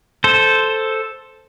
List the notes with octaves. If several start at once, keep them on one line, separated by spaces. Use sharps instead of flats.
A4 C5